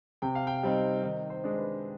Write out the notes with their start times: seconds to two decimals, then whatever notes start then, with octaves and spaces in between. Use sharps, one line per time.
0.22 C3 G5
0.35 F5
0.47 G5
0.63 G3 C4 D#4
1.03 D#3 D#5
1.30 C5
1.44 G#3 D4
1.58 B4